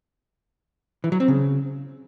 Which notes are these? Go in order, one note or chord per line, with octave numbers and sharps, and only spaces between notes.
E3
F#3
C4
C#3